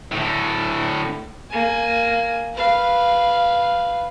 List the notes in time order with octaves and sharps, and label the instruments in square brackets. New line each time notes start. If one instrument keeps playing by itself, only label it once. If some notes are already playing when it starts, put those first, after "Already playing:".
[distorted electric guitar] A2 D3
[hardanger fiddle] A#3 G#5
B4 F5